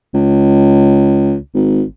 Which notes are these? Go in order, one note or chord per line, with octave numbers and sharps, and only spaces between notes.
C#2
G#1